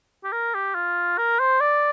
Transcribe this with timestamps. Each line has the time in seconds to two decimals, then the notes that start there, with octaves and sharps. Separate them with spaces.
0.24 G4
0.32 A#4
0.54 G4
0.75 F4
1.18 A#4
1.40 C5
1.60 D5